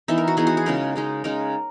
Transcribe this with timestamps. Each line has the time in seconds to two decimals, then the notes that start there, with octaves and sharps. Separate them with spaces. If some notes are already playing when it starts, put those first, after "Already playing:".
0.08 E3 B3 D#4 E5
0.18 A#4
0.28 F#4
0.37 E3 B3 D#4 G#4
0.47 F#4
0.57 G#4
0.66 C#3 G#3 D#4 A#4
0.96 C#3 G#3 D#4
1.24 C#3 G#3 D#4 A#4